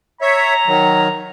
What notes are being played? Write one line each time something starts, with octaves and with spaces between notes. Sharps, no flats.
C#5 E5 A#5
D#3 F#3